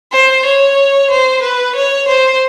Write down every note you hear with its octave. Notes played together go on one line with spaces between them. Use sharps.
C5
C#5
C5
B4
C#5
C5